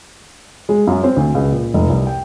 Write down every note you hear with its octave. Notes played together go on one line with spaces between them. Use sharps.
G#3
F#2
C4
D2
C#2
A#2
F1
C2
G5